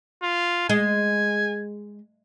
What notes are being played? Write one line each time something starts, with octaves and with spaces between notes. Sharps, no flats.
F4
G#3 G#5